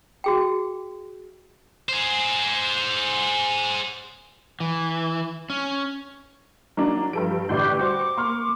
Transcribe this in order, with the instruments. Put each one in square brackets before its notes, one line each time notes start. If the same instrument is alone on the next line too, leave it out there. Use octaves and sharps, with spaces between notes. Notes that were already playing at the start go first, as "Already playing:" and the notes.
[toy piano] F#4 G#4 G5
[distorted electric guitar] G#4 C5
[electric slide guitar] E3
C#4
[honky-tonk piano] F#3 A#3 D4 [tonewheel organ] D#4
[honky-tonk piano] G2 A4 D7 [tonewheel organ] F3 G4 B4
[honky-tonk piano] A1 A2 D5 [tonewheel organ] D3 C6 G6 [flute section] G4 B4
[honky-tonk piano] G3 F#4 C5 [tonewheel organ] C#6 [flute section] D6
[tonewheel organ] A#3 [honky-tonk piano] C6 C#6 F6